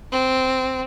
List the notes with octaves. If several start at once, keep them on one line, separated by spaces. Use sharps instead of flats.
C4